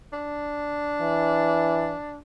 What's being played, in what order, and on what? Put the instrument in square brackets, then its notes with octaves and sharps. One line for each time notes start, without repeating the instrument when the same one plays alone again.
[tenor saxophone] D4
[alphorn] E3